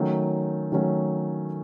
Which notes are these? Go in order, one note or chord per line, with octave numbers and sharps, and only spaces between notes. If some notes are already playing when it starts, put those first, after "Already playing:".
Already playing: D#3 F#3 A3 C#4
D#3 F#3 A3 C#4